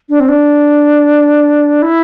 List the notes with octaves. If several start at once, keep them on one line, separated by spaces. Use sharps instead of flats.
D4
C4
D4
E4